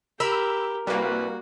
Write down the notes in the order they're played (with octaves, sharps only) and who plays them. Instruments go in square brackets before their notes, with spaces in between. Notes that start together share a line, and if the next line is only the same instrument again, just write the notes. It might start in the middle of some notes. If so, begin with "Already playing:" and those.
[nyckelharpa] G4 [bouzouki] A#4 [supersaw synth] B5 E6
[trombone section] C2 B4 [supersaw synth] G3 A#3 [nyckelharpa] F#4